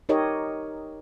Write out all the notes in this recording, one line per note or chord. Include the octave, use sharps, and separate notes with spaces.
D#4 G4 A#4 C#5 D#5